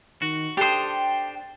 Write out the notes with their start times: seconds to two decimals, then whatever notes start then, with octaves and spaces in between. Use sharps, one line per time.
0.22 D#3 F#4
0.57 D4 G4 A4 C5 G5 D#6